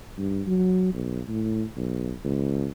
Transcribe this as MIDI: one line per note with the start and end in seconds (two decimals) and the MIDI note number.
0.18 0.42 43
0.47 0.92 54
0.94 1.20 35
1.29 1.64 45
1.76 2.11 35
2.24 2.67 37